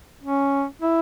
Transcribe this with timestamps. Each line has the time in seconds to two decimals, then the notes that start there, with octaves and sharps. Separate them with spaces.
0.23 C#4
0.82 E4